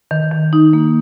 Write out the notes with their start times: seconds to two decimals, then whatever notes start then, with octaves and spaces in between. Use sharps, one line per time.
0.11 D#3
0.32 D#3
0.53 D#4
0.73 A#3